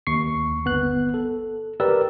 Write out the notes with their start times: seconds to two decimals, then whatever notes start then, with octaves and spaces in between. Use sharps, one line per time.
0.07 D#2 C#6 C7
0.65 G1 B3 F#6
1.14 A4
1.80 G4 A#4 B4 D5 E6